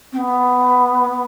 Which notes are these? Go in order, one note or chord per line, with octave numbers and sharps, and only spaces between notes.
C4
B3